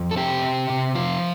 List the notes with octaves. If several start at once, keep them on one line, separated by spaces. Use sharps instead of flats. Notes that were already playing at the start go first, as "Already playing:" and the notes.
Already playing: F2
A4
C4 G4
C3
C3
F3 F4